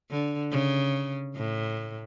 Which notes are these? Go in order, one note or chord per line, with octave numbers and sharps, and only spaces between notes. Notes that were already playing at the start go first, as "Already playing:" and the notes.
D3
C#3
A2